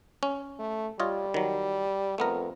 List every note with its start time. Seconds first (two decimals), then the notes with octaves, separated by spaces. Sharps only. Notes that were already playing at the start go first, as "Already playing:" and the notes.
0.23 C#4
0.59 A3
1.00 G3 F4 C#5 D#5
1.34 D#3 F#3
2.18 F2 A3 B3 A#4